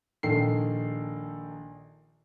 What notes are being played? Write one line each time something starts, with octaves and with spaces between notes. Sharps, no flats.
A#1 D#3 A4 G5 C7